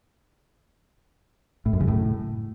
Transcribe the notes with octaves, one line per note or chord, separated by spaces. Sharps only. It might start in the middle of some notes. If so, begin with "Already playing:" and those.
A2
F#2
C#3
A2